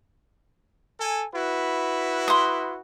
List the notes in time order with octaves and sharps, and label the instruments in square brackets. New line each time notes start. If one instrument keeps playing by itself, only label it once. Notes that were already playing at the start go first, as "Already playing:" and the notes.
[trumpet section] A4 G#5
E4 F#4 B4
[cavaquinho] C6 D#6